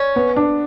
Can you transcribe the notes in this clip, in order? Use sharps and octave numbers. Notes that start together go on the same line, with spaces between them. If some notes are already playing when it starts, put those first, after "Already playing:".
Already playing: C#4
B3
D4